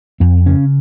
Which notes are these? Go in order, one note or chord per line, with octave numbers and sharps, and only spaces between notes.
F2 C4
C#3 C#4